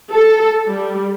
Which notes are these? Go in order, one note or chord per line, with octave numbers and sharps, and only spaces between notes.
A4
G3